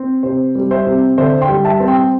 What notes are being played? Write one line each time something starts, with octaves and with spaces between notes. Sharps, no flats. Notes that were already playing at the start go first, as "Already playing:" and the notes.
Already playing: C4
C3 C5
G3
C5 E5
C3
D3 C5 E5
G5 C6
G3
E5 A5
C4
G5 C6